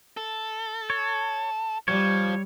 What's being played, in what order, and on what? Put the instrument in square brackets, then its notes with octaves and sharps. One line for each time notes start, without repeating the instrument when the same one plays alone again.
[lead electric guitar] A4
[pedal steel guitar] C#5
[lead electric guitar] F3 [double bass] G3 [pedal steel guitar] C#5